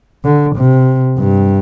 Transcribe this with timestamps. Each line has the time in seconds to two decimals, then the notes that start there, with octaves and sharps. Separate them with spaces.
0.24 D3
0.56 C3
1.19 G2